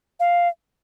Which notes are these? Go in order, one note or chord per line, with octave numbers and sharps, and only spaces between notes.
F5